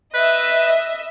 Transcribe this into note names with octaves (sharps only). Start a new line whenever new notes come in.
B4 D#5 E5